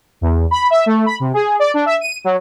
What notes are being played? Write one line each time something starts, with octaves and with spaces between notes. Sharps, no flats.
E2
B5
E5
A3
B5
C3
G#4
D5
D4
E5
D#7
F#3